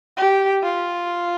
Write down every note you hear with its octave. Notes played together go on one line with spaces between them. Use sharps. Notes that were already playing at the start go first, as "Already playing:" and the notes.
G4
F4